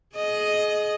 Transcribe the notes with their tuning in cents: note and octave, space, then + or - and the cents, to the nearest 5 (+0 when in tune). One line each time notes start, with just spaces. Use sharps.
G#4 +30 D#5 +0